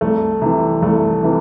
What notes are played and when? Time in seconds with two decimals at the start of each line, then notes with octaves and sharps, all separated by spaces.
0.01 C2 A3
0.42 C3 E3
0.82 C2 A3
1.23 C3 E3